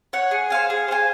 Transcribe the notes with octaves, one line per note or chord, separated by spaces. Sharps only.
C#5 F#5
G#4
C5 F5 G#5
G#4
C5 F5 G#5